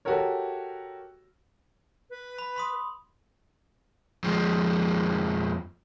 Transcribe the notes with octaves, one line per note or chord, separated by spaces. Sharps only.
F#4 G4 A4 A#4 C#5
B4
B5
B5 C6 D#6
F2 F3 G#3 C4